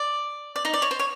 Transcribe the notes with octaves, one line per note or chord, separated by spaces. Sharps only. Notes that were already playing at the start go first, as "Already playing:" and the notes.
Already playing: D5
D5
D#4 D#5
D5
C#5
C5
C#5